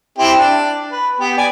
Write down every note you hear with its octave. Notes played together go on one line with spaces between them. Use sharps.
C4 E4 G4
D4
B4
B3 G4
D5 G#5